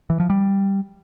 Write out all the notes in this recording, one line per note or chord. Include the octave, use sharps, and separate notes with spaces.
E3
F3
G3